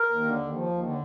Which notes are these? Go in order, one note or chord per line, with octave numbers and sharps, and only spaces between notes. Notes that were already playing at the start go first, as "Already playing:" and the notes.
Already playing: A#4
D#2
D3
D#2
F3
D#2
D3